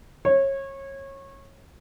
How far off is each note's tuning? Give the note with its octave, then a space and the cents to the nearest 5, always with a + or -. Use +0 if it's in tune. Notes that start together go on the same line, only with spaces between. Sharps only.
C#5 -25